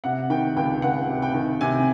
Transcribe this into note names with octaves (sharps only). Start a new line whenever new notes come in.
C3 F#5
D#3 G5
C#2 G5
C#2 F#5
C3
G5
D#3
C3 G#5